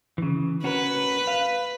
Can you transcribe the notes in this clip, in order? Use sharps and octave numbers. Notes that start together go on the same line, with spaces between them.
C#3 E3
C#4 F#4 A#4 B4
F5